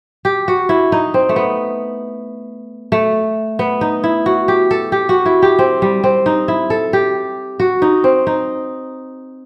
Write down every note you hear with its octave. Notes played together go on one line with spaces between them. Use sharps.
G4
F#4
E4
D#4
C4
A3
B3
A3
B3
D#4
E4
F#4
G4
A4
G4
F#4
E4
G4
C4
G3
C4
D#4
E4
A4
G4
F#4
D#4
C4
D#4